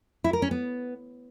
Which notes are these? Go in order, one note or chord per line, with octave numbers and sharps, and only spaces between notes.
E4
A#4
C#4
B3